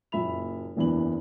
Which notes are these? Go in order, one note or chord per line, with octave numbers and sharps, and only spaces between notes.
F#1 A#2 E5 B5 F7
F#1 E2 E3 D4 B5 F#7